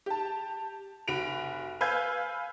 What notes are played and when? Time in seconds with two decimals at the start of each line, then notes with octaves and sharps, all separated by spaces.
0.06 G4 A5
1.08 F1 F#4 B5 D7 F7
1.81 B4 F5 G#5 E6 G6 G#6